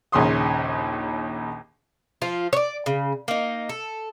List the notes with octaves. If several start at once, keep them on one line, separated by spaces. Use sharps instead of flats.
A#1 D#2 C#3 C6 D#6
F3 F4
C#5 D5
C#3
A#3 D#4
A4